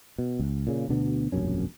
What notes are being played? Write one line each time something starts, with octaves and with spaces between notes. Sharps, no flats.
B2
C#2
A#2 C#3
D2 B2 D3 B3
E1 A#1 F#2 C#4